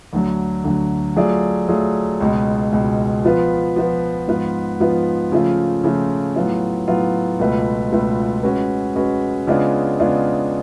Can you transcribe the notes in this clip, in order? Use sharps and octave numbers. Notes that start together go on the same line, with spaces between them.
D2 D3 F#3
D2 D3 F#3
F#3 A3 F4 G#4 D5
F#3 A3 F4 G#4 D5
C#2 B2 G#3
C#2 B2 G#3
F3 B3 F4 B4
F3 B3 F4 B4
G#2 F3 B3 F4 B4
G#2 F3 B3 F4 B4
C#3 F3 A3 F4
C#3 F3 A3 F4
A2 F#3 B3 F4
A2 F#3 B3 F4
C#2 B2 A3 F4 B4
C#2 B2 A3 F4 B4
G#3 C#4 F#4 B4
G#3 C#4 F#4 B4
C#3 G#3 B3 D4 F4
C#3 G#3 B3 D4 F4